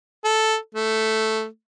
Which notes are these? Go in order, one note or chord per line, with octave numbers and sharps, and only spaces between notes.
A4
A3